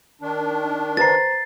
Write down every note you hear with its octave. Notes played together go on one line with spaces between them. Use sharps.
D#3 D4
B4 C5 A#5 A6 C7